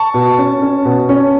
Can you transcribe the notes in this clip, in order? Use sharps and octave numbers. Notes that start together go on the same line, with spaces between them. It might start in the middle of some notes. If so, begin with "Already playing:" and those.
Already playing: A5 C#6
B2
C#4
C#4
B2
C#4